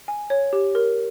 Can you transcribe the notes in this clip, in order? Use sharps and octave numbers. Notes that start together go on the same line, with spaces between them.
G#5
C#5
G4
A#4